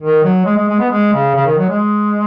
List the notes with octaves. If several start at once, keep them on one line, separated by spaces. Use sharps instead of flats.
D#3
F#3
G#3
G#3
G#3
B3
G#3
C#3
C#3
D#3
F#3
G#3